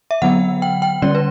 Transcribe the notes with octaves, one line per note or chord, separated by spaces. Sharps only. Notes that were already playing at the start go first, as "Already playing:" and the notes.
E5
D3 F#3 B3 F#5
G5
G5
D3 G3 C#4 D5
B4